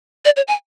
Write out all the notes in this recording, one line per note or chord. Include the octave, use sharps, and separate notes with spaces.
D5
C#5
G#5